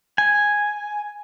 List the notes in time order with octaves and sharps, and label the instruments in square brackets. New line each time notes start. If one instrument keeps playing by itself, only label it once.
[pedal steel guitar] G#5